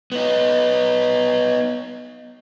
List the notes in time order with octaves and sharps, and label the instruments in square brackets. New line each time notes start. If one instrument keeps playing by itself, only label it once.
[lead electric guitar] B3 D#4